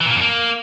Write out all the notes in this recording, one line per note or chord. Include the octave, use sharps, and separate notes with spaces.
E3
A#2
A#3
F2
A#3